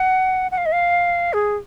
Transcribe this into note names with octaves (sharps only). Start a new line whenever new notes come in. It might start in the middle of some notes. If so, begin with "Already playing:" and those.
Already playing: F#5
F#5
F5
D#5
F5
G#4